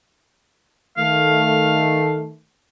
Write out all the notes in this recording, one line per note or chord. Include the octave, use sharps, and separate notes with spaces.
D#3 A3 F5